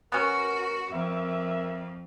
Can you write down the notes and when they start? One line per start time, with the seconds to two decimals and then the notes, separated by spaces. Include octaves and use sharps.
0.12 B3 C#4 F#4 A#4
0.91 F2 A#4 E5